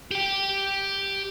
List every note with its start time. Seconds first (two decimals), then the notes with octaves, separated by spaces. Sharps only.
0.11 G4 G5